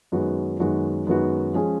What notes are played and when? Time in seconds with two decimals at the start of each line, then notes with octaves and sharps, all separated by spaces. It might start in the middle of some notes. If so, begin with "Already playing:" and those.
0.12 F#2 D#3 G#3 B3 F#4
0.60 F#2 D#3 G#3 B3 F#4
1.07 F#2 D#3 G#3 B3 F#4
1.53 F3 G#3 C#4 G#4